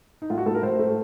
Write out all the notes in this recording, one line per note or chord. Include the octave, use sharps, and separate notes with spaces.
D#4
A2 F4
F#4
A2 A4
A#4
A2 C5
A3